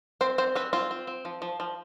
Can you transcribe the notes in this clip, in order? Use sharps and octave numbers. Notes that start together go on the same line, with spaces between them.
C4 C5
C4 C5
C4 B4
C4 F4
C4
C4
F3
F3
F3